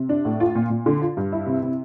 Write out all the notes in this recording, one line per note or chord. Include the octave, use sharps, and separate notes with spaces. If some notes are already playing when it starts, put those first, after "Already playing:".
Already playing: C3
D4
A2
F4
A#2
A#2
D3
F4
G2
E4
C3
C3